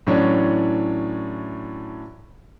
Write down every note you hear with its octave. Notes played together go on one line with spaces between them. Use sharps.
A2 E3 F#3 C#4 D4